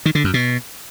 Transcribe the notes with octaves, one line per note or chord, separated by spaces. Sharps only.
D#3
D3
F#2
B2